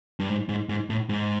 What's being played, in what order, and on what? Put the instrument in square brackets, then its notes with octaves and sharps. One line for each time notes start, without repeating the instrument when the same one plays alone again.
[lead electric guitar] G2
G#2
G#2
G#2
A2
G#2